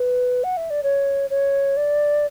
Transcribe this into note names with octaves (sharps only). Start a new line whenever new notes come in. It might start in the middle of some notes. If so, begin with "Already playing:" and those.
Already playing: B4
F#5
E5
D5
C#5
C#5
D5